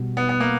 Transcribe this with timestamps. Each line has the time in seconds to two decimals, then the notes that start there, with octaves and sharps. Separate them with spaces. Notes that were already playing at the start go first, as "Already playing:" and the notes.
Already playing: B2 G3
0.17 B3
0.29 B3
0.40 A#3